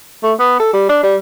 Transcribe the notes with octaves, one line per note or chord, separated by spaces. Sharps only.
A3
B3
A4
G3
D4
G3